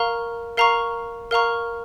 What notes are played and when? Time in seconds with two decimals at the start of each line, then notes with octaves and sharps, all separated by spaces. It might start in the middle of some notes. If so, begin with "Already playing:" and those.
Already playing: A#4 F5 A#5 C#6
0.57 A#4 F5 A#5 C#6
1.31 A#4 F5 A#5 C#6